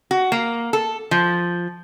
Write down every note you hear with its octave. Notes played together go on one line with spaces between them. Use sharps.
F#4
A#3
A4
F3